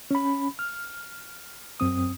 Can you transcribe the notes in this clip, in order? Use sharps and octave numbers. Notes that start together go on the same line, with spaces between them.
C#4 B5
F6
F#2 C4 D#6